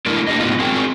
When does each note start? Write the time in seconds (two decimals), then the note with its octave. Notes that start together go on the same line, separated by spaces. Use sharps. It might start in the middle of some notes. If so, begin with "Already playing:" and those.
0.06 A3 D4 E4 A4 A#4
0.27 A#3 D4 D#4 G4 D#5
0.40 A2 B3 D4 D#4 F4
0.59 C4 F#4 G#4 A#4 G5